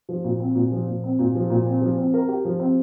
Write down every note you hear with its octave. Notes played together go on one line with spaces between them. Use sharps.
F3
A#2
C4
A#2
F3
A#2
C4
A#2
F3
A#2
C4
F3
C4
A#4
G4
F3
C4